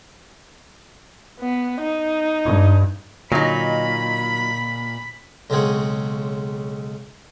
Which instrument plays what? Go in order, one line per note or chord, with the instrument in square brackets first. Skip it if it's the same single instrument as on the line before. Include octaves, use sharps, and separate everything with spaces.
[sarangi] B3
D#4
[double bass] G2
[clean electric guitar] A#2 [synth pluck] D3 D#5 [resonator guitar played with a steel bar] F#3 D#4 [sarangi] B5
[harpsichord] B1 C#3 G#3 C4 G#4 F#5